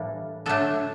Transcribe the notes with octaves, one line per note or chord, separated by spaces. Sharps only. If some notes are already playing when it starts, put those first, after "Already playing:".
Already playing: A2 E3 G3 A#3 D4
D3 F#3 A3 D4 A4